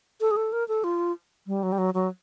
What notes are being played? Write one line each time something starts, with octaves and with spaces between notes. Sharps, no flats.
A4
G#4
A4
A#4
A4
F4
G3
F#3
G3
F#3
F#3